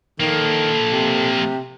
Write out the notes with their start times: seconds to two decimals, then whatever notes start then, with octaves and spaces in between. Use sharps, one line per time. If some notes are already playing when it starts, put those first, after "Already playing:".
0.20 D#3 F3 A#3 A4
0.92 C3